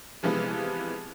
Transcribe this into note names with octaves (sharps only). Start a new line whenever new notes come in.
C3 E3 F3 G#3 B3